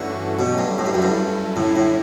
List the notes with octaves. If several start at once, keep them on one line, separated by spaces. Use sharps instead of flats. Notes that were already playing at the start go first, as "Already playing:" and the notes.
Already playing: G2 D3 E3 A3 C#4 F#4
B2 F#3 A3 C#4 G4
G2
A2
G2
F#2
G2 F#3 C#4 E4 A4
F#2 A2 D3 G3 C#4 E4
A2